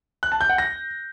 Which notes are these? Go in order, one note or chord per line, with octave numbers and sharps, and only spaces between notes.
F#6
A5
G6
F#5
A#6